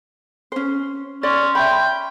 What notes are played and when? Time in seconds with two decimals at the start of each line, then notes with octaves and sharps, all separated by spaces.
0.52 C#4 C5
1.23 C#4 D5 C6
1.55 E5 G5 B5